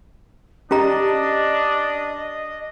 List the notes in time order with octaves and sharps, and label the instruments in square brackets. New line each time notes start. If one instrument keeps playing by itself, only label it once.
[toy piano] C#4 G4 A#5 [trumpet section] D4 [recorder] D#5